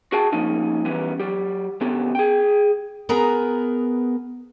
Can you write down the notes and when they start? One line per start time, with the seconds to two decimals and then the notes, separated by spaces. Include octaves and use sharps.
0.12 F#4 G#4 F5 G5 A5
0.32 F3 A#3 C#4 D#4
0.85 E3 G3 B3 C#4
1.20 F#3 G4
1.81 D3 B3 C#4 G4 A4
2.15 G#4 G5
3.09 B3 G#4 A#4 B4 A#5